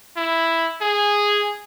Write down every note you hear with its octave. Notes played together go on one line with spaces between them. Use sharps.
E4
G#4